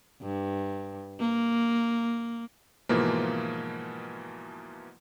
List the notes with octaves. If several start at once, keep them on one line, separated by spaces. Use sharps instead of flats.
G2
A#3
G#2 B2 E3 F3 A#3